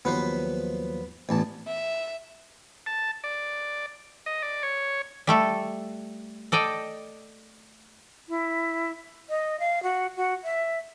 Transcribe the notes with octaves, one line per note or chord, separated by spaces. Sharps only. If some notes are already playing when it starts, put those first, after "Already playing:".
D#2 F3 F#3 B3 B4 C5
A1 E2 A5
E5
A5
D5
D#5
D5
C#5
G3 A3 A4
A4 D5 D#5 G5
E4
D#5
F5
F#4
F#4
E5